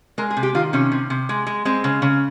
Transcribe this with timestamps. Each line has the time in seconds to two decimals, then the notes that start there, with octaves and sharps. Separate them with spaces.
0.18 G#3 A#4
0.31 G#4
0.37 C3
0.43 G4
0.55 D#3 F4
0.73 C3 C#4
0.92 C3
1.10 C3
1.29 G#3
1.47 G#3
1.65 G#3 C4
1.84 C#3
2.02 C#3